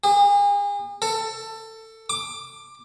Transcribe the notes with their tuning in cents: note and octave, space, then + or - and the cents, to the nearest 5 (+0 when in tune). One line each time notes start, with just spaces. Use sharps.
G#4 -40
A4 +20
D6 +15